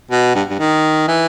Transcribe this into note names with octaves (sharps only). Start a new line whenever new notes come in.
B2
G2
G2
D#3
E3